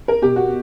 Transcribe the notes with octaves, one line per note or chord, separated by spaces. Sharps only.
A#4
B2 G4
F#4